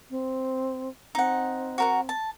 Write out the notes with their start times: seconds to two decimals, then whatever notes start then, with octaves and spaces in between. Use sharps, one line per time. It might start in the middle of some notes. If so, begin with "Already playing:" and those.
0.10 C4
1.15 C4 D#4 F#5
1.78 F#4 A#4 F#5
2.09 A5